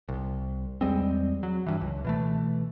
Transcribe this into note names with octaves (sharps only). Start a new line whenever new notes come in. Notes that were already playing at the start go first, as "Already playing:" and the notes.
C2
E2 G3 G#3 C4
F#3
G2 E3
C#2
B2 E3 A3